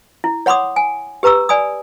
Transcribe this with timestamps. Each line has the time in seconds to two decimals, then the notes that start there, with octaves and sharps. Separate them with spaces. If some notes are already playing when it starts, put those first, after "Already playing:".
0.24 E4
0.46 C#5 F#5 B5 C6 D6 D#6
0.76 G#5
1.23 G4 B4 A#5 D6 E6
1.49 D5 G#5 B5 D#6